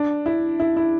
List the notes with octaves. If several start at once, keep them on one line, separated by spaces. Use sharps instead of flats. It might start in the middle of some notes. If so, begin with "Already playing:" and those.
Already playing: D4
E4
E4
E4